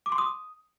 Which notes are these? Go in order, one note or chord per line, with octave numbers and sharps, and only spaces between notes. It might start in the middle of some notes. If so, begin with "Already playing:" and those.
D6
C6
D#6